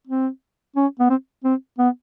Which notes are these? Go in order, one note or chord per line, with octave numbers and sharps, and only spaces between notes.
C4
C#4
B3
C4
C4
B3